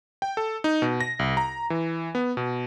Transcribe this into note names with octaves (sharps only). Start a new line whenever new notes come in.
G5
A4
D#4
B2
A#6
C2
A#5
E3
B3
B2